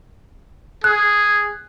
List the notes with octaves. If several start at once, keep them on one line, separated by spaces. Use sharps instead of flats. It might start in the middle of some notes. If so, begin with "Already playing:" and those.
G#4 F#6